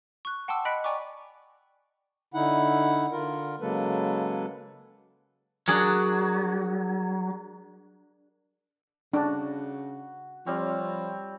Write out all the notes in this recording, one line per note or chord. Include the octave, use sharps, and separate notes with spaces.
C#6 F#6
F#5 G5 A5 C6 D6 E6
D#5 B5 F#6 B6 C#7 D7
D5 G5 G#5 A#5 C#6 D6
D3 D#4 E4 F#5
D3 F4 A#4
C#3 F#3 G#3 A#3 A4 B4
F#3 D4 G#4 A#4
C#3 D4 F#4
F3 G3 C4 C#5